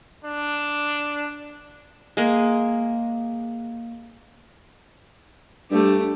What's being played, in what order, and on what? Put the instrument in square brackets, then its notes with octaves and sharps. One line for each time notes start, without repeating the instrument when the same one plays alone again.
[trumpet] D4
[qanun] G#3 A#3
[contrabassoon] G2 [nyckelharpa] A3 G4